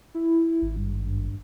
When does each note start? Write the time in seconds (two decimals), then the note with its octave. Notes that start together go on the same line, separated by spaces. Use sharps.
0.14 E4
0.62 G#1
0.76 G2